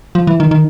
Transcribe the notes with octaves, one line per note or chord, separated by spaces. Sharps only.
F3
E3
D#3
D#3